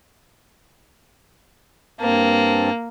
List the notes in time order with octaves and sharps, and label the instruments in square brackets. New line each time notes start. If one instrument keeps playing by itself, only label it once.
[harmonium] G2 C4 A5 [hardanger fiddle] A#3